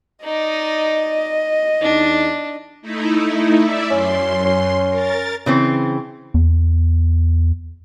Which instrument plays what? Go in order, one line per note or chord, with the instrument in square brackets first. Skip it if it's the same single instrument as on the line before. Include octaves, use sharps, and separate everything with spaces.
[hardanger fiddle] D#4 D5 [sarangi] D#5
[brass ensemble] E2 D#4 [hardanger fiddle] D4
[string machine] A3 D#4 E4
E4 D5 E5
[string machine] F#2 C6 [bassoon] C#4
[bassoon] C#4
[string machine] A#4 A6
[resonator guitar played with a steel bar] C#3 E3 C4
[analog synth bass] E2